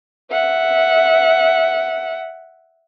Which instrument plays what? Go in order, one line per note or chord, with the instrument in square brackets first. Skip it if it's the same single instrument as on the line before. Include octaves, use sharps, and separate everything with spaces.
[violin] E5 F#5